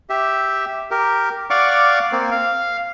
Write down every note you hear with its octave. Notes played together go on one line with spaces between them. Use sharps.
G4 E5
G4 A#4
D5 F5 F#5 C#6 D6
A#3 C4
F5